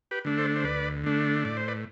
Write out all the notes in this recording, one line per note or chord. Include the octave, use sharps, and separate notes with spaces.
G4 B4
D3 A3 D4
A4 C5
C5
D2 B4 D5
D3 A3 D4
A2 D5
C5
B4 D5